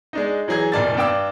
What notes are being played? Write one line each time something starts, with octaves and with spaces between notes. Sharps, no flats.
G#3 D4 D#4
E3 F#3 G#4 A#5 G#6
F1 A#2 D#3 D5 A5 A6
G2 D4 G5 D6 E6